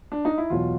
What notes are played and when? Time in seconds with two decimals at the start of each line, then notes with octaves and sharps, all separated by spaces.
0.12 D4
0.25 D#4
0.38 E4
0.50 E2 B2 F#3 F4